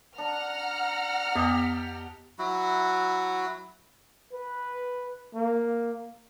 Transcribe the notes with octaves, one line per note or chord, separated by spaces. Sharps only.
D4 F#5 A#5 F6
F2 B3 G4 D#5 A5
F#3 E4 F#4
B4
A#3